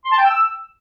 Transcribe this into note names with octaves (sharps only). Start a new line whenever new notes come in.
C6
A5
G5
E6